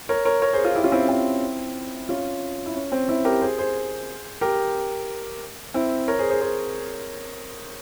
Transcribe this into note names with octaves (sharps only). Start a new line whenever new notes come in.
A#4 C#5
A#4 C#5
A#4 C#5
G#4 C5
F4 G#4
E4 G4
C#4 F4
C4 E4
C#4
C4 E4
C#4 F4
E4
C#4
C4
C4 E4
G4 A#4
G#4 C5
G#4 C5
G4 A#4
C4 E4
A#4 C#5
G#4 C5
G#4 C5
G#4 C5